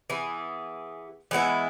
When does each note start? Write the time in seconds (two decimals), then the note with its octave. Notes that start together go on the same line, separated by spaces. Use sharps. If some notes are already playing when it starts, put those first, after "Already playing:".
0.10 E3 B3 G#4
1.31 E3 G#3 B3 E4